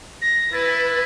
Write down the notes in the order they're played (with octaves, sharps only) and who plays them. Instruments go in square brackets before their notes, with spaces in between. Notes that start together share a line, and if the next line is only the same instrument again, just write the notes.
[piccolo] A#6
[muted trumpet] E4 [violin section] B4 [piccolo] A6